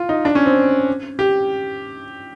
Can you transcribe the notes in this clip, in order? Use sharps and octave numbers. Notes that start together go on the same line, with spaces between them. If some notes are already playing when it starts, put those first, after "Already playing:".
Already playing: F4
D#4
D4
C#4
C4
G4